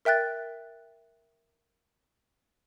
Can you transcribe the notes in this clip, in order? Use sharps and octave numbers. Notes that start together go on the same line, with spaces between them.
A#4 E5 G5 F#6 A6